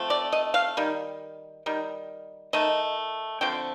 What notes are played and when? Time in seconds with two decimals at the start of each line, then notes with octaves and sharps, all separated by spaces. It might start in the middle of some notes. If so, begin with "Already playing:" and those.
Already playing: F3 A3 C4
0.10 D5
0.33 D#5
0.54 F5
0.77 D#3 G3
1.66 D#3 G3
2.53 D#3 A3 D#5
3.41 D3 F3 A3 C4 G5